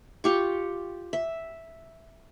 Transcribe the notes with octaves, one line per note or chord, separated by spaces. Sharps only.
F4 G4 C#6
E5